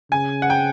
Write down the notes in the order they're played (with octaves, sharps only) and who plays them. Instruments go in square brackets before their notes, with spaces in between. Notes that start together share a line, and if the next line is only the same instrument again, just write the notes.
[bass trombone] C#3 [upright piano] G#5
[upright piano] F#5
G5